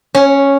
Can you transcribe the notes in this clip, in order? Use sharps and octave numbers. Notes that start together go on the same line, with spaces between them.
C#4